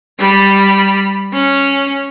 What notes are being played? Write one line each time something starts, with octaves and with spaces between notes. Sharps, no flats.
G3 B5
C#4